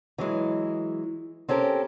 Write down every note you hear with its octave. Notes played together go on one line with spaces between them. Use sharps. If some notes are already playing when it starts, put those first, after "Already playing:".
E3 F#3 G#3
C4 C#4 G4 A4 A#4